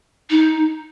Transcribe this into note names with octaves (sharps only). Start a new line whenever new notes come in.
D#4